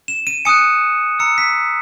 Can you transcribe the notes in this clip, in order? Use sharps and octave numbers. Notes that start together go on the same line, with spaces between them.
E7
D#7
G#5 D#6 F#6 C#7
A#5 E6 C#7
B6